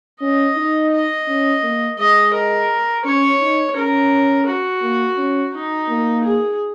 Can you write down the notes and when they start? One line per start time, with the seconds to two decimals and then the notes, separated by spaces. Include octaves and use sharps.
0.21 C#4 D#5
0.57 D#4
0.91 D#5
1.27 C#4
1.63 A#3
1.99 G#3 D#5
2.34 A#4
3.05 C#4 C#5
3.40 D#4
3.76 C#4 A#4
4.46 F#4
4.82 A#3
5.17 C#4
5.54 D#4
5.89 A#3
6.24 G#4